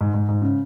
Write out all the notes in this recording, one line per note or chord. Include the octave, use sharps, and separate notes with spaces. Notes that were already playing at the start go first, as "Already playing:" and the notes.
G#2
G#2
G#2
C#3